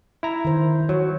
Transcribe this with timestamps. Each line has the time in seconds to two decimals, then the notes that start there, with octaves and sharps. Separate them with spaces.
0.23 E4 A#5
0.45 D#3 C5
0.89 F#3 C#5